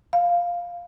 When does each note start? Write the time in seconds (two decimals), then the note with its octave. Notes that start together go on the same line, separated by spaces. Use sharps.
0.13 F5